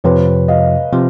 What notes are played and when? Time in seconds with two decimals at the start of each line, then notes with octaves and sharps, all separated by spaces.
0.04 F2 C3 F3 B4 C#5
0.48 D#5 F5
0.92 C3 F3